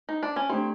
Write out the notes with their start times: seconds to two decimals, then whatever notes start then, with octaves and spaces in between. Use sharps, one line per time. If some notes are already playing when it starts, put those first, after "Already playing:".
0.09 D#4
0.23 D4
0.36 C#4
0.49 A3 C4 D4 G4